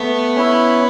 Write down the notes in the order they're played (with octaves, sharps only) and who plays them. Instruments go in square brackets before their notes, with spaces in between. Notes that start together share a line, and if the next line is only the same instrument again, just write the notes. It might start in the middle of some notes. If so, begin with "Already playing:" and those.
Already playing: [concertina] A3 [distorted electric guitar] B3
[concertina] C#4 E4